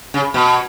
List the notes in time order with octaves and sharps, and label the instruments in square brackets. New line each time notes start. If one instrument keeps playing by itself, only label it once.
[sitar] C#3
B2